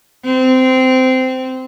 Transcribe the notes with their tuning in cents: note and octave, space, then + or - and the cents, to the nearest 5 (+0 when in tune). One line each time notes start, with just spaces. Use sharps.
C4 -15